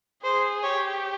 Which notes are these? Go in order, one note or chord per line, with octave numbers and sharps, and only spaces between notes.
G#4 C5
G4 C#5